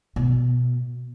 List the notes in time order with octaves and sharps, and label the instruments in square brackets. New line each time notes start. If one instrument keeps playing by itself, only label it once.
[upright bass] B2